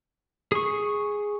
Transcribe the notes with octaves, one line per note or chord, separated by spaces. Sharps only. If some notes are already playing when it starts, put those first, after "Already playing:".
G#4 C#6